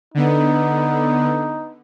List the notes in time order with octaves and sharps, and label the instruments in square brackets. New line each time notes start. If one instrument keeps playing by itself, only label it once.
[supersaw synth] D3 B3 [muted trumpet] D#4